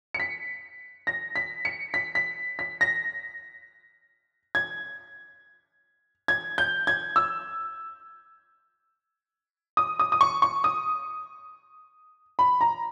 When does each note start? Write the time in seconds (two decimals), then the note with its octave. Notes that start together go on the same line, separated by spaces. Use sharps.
0.14 C#7
0.20 B6
1.07 A#6
1.36 B6
1.65 C#7
1.94 B6
2.15 B6
2.59 B6
2.81 A#6
4.55 G#6
6.28 G#6
6.58 G6
6.87 G#6
7.16 E6
9.77 D#6
9.99 D#6
10.12 D#6
10.21 C#6
10.42 C#6
10.64 D#6
12.39 B5
12.61 A#5